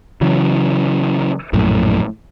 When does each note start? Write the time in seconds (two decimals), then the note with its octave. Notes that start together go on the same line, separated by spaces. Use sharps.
0.21 C#3 E3 F#3
1.53 A#1 F#2 A2